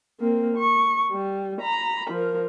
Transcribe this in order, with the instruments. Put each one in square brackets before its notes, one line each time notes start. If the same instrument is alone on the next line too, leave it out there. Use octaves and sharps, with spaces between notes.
[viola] A#3 C4
C#6
G3
A#5 B5
F3 A#4